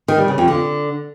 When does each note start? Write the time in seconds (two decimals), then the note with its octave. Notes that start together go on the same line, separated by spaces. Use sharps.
0.08 D#3
0.18 G3
0.28 C#3
0.38 F2
0.48 D3